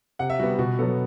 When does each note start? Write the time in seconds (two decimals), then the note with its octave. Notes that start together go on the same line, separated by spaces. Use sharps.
0.19 C3 F#5
0.30 E5
0.39 G3 F#4
0.43 B3
0.59 B2 F#4
0.79 F#3 B3 A4